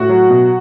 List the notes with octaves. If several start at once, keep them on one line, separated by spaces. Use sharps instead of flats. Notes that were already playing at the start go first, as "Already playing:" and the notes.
Already playing: A2 F#4
F#3
B2